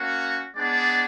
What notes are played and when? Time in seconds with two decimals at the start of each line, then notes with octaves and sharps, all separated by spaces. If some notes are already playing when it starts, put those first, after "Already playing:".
Already playing: A#3 C#4 F#4
0.55 G#3 B3 D4 D5